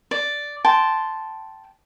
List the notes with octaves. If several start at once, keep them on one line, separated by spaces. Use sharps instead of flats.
D5
G5 A5 C6